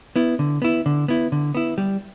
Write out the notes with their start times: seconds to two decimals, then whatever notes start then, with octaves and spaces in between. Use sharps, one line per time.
0.16 B3 E4
0.39 D3
0.62 B3 E4
0.86 D3
1.08 B3 E4
1.32 D3
1.55 B3 E4
1.78 G3